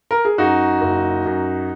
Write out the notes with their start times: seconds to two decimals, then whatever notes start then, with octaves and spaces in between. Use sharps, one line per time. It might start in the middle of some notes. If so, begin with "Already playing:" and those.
0.11 A#4
0.25 G#4
0.38 F#2 D#4 F#4
0.81 F#1
1.26 F#2